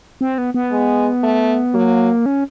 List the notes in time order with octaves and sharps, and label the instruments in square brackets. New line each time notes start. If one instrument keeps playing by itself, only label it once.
[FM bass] C4
B3
B3
[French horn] G#3
A3
[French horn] F#3 [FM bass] A#3
[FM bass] C#4